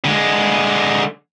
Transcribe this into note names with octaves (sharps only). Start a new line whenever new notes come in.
D3 G#3